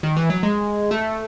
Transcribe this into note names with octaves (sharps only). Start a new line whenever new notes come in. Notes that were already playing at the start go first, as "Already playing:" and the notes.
D#3
E3
F#3
G#3
A3